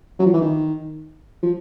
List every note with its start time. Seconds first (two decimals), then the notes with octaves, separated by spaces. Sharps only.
0.19 F#3
0.26 F3
0.34 E3
0.41 D#3
1.43 F3